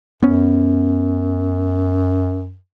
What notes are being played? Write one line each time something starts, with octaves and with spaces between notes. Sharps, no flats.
F#2 B3 C#4